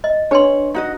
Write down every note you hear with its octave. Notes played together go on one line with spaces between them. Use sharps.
D#5
D4 B4 C#5 C6
D#4 F#4 D#5